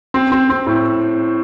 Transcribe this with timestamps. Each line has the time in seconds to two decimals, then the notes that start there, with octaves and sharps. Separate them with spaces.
0.14 C4
0.32 C4
0.49 C4
0.67 A2